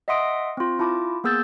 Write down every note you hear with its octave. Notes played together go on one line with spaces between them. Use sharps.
D#5 E5 F#5 C6 D#6 D7
C4 F4
E4 F4 A5 D6
A#3 B3 G#4 E6 G6 A6